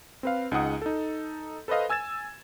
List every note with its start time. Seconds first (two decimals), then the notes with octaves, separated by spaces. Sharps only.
0.23 C4 B4 F5
0.51 C#2 D#4 G#4 F#5 D#6
0.82 D#4 A4
1.68 A4 B4 C5 D#5 F5
1.90 G#5 E6 G#6 A6 E7